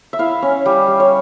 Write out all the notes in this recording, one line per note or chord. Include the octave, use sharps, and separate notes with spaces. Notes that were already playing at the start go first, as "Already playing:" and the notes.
E5
E4 F5
C#4
G3
G3
C#5